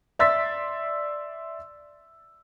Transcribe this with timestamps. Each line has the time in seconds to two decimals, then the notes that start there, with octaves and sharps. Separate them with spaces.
0.19 D5 E5 C6 E6 A6 B6